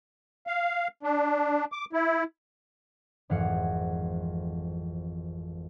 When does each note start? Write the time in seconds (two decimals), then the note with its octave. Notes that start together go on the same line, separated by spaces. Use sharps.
0.47 F5
1.03 D4
1.72 D6
1.93 E4
3.30 G#1 F2 E3 F5 F#5 C#7